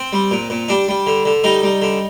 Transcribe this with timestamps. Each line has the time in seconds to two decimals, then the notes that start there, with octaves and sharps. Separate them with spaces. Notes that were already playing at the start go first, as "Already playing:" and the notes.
Already playing: C4
0.13 G3
0.31 A#2
0.50 A#2
0.68 G3 D4
0.88 G3
1.07 D3
1.25 D3
1.44 G3 D#4
1.63 G3
1.82 D3